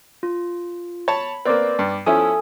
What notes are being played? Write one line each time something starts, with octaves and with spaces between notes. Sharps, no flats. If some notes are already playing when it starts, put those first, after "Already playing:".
F4
C#5 A5 B5
A#3 C4 B4 D5 D6
G2
F3 C#4 E4 A4 G#5 D#6